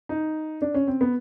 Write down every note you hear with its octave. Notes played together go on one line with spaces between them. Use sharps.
D#4
D4
C#4
C4
B3